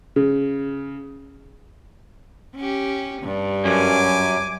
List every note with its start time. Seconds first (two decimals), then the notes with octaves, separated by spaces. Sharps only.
0.16 C#3
2.56 C#4 G4
3.22 G2
3.65 F#2 C#4 G#5 D6